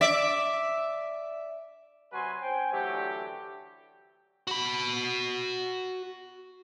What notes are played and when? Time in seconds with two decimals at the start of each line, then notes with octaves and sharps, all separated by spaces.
0.01 D5 E5
2.12 C3 F#3 F#4 B4 G#5 C6
2.41 C#4 C5 G5 G#5
2.72 D3 E3 F#3 A3 G4
4.47 F#4 B5